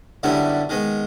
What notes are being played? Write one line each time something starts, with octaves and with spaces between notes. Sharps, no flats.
F#2 D3 G3 B3 E4
D#3 G#3 B3